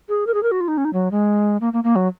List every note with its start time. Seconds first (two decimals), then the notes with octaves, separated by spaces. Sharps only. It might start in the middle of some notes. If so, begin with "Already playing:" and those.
0.09 G#4
0.27 A#4
0.34 G#4
0.43 A#4
0.51 F#4
0.60 F4
0.68 D#4
0.77 C#4
0.85 D#4
0.93 F#3
1.11 G#3
1.61 A#3
1.73 A#3
1.84 A#3
1.96 F#3